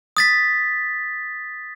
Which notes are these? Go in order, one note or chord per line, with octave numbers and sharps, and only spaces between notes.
D#6 A6 B6